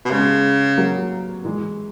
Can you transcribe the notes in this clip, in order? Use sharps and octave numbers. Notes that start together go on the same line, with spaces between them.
B2
C#3 G#3 B3
F#3 A#3
E3 G#3